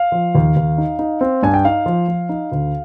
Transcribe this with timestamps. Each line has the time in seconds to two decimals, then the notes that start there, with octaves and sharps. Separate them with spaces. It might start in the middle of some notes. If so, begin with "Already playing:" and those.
Already playing: F5
0.12 F3
0.35 D#2
0.56 D#2
0.78 D#4
0.99 D#4
1.21 C4
1.43 G2 G#5
1.54 G5
1.65 D#4 F5
1.86 F3
2.08 F3
2.29 D#4
2.52 D2